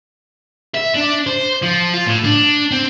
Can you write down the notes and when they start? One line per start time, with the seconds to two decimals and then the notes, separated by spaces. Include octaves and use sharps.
0.74 E5
0.95 D4
1.27 C5
1.62 F3
1.93 F4
2.07 A2
2.24 D4
2.71 C4